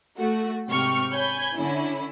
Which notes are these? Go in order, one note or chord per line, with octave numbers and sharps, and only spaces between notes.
A3 F#4
G#2 C3 G5 C#6 F6
C#5 G#5 B5 G6 G#6
D3 C#4 E4